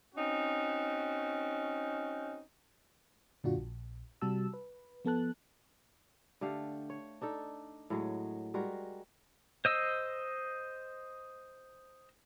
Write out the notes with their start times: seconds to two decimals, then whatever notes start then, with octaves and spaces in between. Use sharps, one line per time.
0.15 C4 C#4 D#4 F#4
3.44 F#2 A#2 D3 D4 F4 F#4
3.57 A#1
4.22 C3 G3 F#4 A5 E6
4.54 B4
5.05 F3 B3 A4 A5 F#6
6.41 D3 A3 G4 F5
6.90 C#5
7.21 D4 D#4 A4
7.90 A2 F#3 G#3
8.54 G3 G#3 F#4 A#4
9.65 C5 D#5 E6